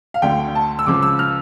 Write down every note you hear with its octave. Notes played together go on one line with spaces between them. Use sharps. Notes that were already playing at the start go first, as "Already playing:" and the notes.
F5
D2 D3 A3 G5
A5
E6
C#2 C#3 F3 D6
E6
F6